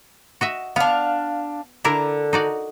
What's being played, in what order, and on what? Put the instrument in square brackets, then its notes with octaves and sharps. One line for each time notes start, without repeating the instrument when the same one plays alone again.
[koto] F#4 D#5 E5
[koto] B3 [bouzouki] D4 F5
[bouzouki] D3 [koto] D4 E4 A#4
[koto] D#4 F#4 D5